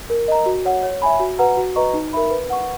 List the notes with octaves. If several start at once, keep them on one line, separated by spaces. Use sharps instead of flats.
A#4
D#5 A#5
F#4
C#5 F#5
C#5
E5 G#5 B5
F#4
B4 F#5 A#5
F#4
B4 D#5 A#5 C#6
D#4
A#4 E5 B5
B4
F#5 C#6